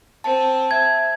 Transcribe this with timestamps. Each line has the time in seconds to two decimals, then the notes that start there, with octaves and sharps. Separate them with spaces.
0.24 C4 A5
0.71 E5 G#6